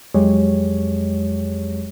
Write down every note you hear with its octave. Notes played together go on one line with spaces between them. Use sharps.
F2 F#3 G#3 G4 C#5